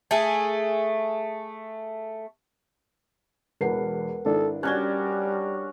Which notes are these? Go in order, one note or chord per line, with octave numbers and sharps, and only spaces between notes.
A3 G#4
E1 E2 A#4 B4 F#5 C7
G#1 D4 E4 A4
G3 C#4 D4 F#4 F#6 G#6 G7